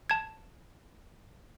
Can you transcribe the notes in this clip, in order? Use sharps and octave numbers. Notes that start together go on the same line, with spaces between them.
A5 G#6